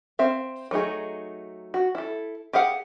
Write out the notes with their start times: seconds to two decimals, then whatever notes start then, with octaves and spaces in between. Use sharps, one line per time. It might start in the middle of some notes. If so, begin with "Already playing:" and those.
0.19 C4 E5 F5
0.71 F#3 A3 D#4 G#4
1.74 F#4
1.95 E4 A4
2.53 G4 G#4 F5 F#5